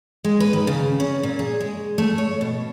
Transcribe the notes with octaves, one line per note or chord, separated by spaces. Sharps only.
G#3
B4
D#3
C#3
C#4
A#2
G#4
G#3
A3
C#5
B2